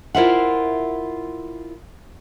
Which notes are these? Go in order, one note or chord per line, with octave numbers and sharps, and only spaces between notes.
E4 F4 A#4 C5 E5 F#5